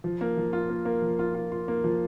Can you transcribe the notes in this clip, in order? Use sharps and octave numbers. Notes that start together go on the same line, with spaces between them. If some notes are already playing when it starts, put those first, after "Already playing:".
F3
A#3
F3
F4
A#3
A#3
F3
F4
F4
F4
A#3
F3